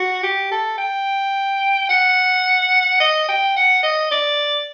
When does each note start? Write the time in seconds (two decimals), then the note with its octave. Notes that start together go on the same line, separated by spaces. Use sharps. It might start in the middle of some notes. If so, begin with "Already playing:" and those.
Already playing: F#4
0.23 G4
0.51 A4
0.78 G5
1.89 F#5
3.00 D#5
3.29 G5
3.56 F#5
3.83 D#5
4.11 D5